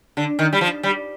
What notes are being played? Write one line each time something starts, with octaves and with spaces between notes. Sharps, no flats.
D3
D#3
G3
F3
G3